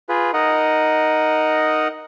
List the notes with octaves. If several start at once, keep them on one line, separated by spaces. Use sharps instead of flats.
F4 G#4 B4
D#4 A#4 D#5 F#5